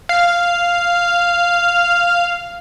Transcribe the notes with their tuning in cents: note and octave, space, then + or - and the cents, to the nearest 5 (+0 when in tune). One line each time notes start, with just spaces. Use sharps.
F5 -5